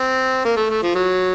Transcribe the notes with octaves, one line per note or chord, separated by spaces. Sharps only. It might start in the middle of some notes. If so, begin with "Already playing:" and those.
Already playing: C4
A#3
A3
A3
F3
F#3